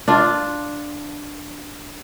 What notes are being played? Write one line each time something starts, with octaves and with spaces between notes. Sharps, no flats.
D4 F4